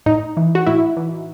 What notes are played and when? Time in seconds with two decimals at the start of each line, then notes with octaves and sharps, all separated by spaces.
0.06 A2 D#4
0.37 E3
0.55 F#4
0.67 A2 E4
0.97 E3